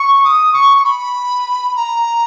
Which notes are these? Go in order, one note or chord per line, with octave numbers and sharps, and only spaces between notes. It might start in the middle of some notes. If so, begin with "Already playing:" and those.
Already playing: C#6
D#6
C#6
C#6
B5
A#5